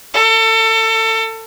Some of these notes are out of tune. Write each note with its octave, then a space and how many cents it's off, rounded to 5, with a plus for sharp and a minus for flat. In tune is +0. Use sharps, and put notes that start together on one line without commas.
A4 +30